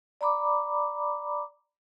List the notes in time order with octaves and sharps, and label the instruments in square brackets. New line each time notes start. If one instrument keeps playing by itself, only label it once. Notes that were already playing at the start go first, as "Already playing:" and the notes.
[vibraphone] D5 A#5 B5 D6